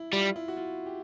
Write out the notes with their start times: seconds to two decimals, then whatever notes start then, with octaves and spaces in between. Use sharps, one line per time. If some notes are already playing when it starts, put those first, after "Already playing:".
Already playing: E4
0.13 G3 F4
0.36 E4
0.48 F#4
0.57 F4
0.86 G4